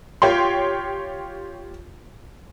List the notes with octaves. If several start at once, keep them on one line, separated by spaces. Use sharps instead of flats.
F4 G4 C#5 G5 C6